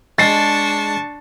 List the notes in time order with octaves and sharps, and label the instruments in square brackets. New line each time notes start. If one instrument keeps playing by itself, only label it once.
[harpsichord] G#3 [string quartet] D4 A5 C#6 [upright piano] A6 C7